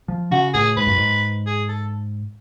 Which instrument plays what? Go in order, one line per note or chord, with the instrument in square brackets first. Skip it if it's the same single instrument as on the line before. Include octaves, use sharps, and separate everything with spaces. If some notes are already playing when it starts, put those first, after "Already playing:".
[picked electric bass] F3
[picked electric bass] C#3 [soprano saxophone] F#4
[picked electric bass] A2 [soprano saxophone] G#4
[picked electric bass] G#2 [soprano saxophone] B4
[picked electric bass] F#2
G#2
[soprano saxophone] G#4
A4